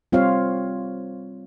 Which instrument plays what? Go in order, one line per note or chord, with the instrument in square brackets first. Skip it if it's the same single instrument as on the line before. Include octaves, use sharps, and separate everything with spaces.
[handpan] G3 C4 F4 C5 C#5 F5